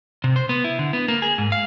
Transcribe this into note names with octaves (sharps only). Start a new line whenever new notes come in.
C3
C5
B3
E4
D3
B3
A#3
G#4
G#2
F5